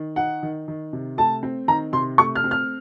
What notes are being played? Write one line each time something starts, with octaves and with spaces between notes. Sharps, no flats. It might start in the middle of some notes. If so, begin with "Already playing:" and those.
Already playing: D#3
D#4 F#5
D#3
D#3
C3
A3 A5
C4
D#3 A#5
C3 C6
A3 C#6
F6
C4
F6